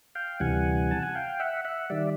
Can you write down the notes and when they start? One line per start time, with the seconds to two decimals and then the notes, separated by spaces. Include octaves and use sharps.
0.15 F5 G5
0.40 D2 C3 E3 G3 F#5 G#5
0.91 A5
1.03 G#5
1.15 F5 G5
1.40 E5 F#5
1.65 E5 F#5
1.90 D#3 G3 D5 E5